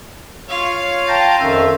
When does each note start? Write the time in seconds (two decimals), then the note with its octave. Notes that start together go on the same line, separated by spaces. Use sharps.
0.49 F4 C#5 F5
1.08 G5 A5 A#5
1.40 F2 D#3 C#4 E5